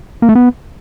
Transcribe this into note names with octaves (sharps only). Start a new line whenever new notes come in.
A#3
A3
B3